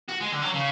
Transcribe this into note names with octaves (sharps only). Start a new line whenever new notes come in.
F#4
G#3
D3
F#3
C#3